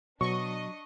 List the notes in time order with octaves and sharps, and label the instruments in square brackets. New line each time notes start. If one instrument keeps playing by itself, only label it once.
[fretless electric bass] B2 [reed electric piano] F#3 [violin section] D4 D#5 [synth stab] C#6